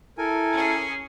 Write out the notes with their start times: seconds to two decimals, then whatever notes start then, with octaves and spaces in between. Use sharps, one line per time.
0.18 E4 A4 A#4 G#5
0.52 C#4 G#4